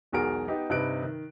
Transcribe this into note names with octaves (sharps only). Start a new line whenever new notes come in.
E1 B1 F#4 G#4 A#4 D7
B3 D#4 G4
G2 C3 D#4 B4 F#6 D7
D#3